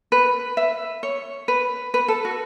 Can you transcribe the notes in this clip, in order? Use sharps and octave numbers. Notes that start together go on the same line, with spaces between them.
B4
E5
C#5
B4
B4
A4
F#4